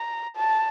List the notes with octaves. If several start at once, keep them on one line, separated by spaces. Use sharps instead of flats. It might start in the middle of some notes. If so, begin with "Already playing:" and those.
Already playing: A#5
A5